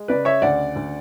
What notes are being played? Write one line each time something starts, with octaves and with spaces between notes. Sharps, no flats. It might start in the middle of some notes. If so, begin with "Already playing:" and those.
Already playing: G#3
C#3 B4 D5
C#5 E5
D2 D5 F#5
D2